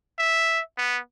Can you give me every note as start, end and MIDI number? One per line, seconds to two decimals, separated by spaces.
0.18 0.60 76
0.77 0.98 59